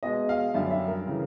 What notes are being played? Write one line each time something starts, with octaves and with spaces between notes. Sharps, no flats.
B2 G#3 D#5
F5
F#2 D3 G3 E5
E5
A#4
C#3 E3